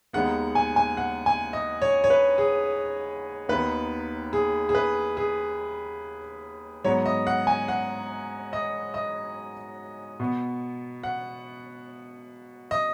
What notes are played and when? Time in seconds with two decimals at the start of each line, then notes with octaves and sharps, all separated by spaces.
0.13 D#2 D#3 G#3 B3 F#5
0.55 G#5
0.76 G#5
0.97 F#5
1.26 G#5
1.53 D#5
1.82 C#5
2.04 C#5
2.10 B4
2.38 G#4
3.49 D#2 D#3 B3 B4
4.33 G#4
4.69 G#4
4.75 B4
5.17 G#4
6.84 G#2 F#3 B3 C#5
7.06 D#5
7.27 F#5
7.47 G#5
7.68 F#5
8.53 D#5
8.94 D#5
10.20 B2 B3
11.03 F#5
12.71 D#5